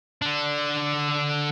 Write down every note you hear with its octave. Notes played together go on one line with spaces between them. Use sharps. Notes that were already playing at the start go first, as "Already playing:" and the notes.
D3 D4